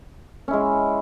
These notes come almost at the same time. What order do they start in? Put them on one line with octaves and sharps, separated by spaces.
C#4 E4 G#3